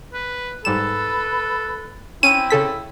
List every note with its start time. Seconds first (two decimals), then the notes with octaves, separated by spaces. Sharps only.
0.13 B4
0.65 G#2 G3 A4 B4 E7
2.23 C4 C#4 E4 D#7
2.50 C#3 A4 B6